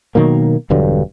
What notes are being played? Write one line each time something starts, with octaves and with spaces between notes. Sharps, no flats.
B2 D#3 F#3 A#3
E1 G2 D3 F#3